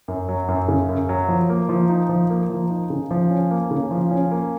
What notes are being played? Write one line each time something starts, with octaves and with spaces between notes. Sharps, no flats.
F#2
F#3
F#2
C#3
F#2
F#3
F3
A#3
F3
D#4
F3
A#3
F3
D#4
C#3
F3
C#4
A#3
C#3
F3
C#4
A#3